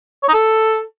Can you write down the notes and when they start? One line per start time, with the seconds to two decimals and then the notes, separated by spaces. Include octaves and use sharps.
0.23 C#5
0.28 D#4
0.33 A4